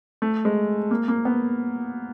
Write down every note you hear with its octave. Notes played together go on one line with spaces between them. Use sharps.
A3
G#3
A#3
A#3
B3